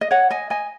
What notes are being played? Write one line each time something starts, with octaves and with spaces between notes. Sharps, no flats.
D#5
C#5 F#5
D#5 G#5
D#5 G#5